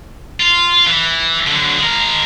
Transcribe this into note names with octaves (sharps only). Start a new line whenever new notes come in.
F4
E3
D3 F#3
G#3 A#4